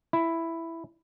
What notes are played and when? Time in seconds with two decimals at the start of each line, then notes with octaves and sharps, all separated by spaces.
0.13 E4